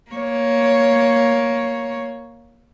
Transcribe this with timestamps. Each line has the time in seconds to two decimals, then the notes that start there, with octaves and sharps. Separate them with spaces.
0.11 A#3 C#5